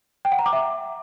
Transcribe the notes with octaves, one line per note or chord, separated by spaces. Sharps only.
G5
F#5
A#5
D6
E5